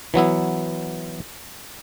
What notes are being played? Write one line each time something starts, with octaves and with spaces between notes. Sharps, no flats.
E3 F#3 B3 E4